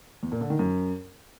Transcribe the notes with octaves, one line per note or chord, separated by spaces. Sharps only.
E2
A#2
D3
D#3
F#2